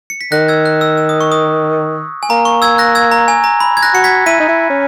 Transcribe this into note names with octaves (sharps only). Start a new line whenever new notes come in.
C#7
B6
D#3 F#6 A#6
E6 G#6
F#6
E6
E6
D#6
C#6
D#6
G#5
A#3 A#5
C#6
E6 G#6
F#6 A#6
E6 G#6
A#5
G#5
A#5
B5
G#6
F#6 A#6
F#4 C#7
G#6 B6
E4 B6 D#7
D#4
E4
C#4